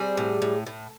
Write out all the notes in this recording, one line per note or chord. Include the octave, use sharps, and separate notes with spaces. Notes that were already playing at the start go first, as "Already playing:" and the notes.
Already playing: G3 C4 G#4
A2
A2
A2